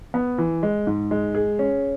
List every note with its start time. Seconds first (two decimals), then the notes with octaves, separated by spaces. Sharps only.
0.14 B3
0.38 E3
0.63 G#3
0.87 G#2
1.11 G#3
1.35 G#4
1.59 C#4